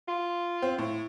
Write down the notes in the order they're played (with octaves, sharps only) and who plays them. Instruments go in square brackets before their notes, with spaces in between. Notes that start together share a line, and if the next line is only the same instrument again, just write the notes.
[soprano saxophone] F4
[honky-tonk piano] C4
A2